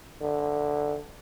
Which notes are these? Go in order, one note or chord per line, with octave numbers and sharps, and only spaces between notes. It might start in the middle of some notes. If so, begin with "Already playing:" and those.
D3